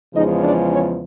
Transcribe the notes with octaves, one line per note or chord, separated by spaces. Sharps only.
E2 C#3 F3 G#3 D#4 D#5
D4 D5
C#4 C#5